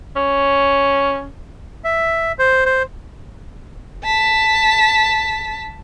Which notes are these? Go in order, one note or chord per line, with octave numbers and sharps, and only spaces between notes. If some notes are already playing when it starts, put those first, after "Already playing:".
C#4
E5
C5
C5
A5 B6